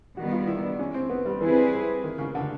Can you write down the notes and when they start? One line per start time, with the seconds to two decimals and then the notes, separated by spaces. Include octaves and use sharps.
0.17 D#3 G3 B3 F#4
0.32 F4
0.47 E4
0.63 D4
0.79 C#4
0.94 C4
1.10 B3
1.26 G3
1.41 E3 G3 C4 E4 G#4 B4
2.04 D#3
2.18 C#3
2.35 D3